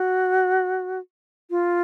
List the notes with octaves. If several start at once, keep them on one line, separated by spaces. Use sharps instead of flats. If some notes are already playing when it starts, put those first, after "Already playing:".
Already playing: F#4
F4